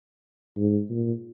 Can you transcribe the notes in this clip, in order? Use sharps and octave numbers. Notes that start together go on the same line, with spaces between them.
G#2
A#2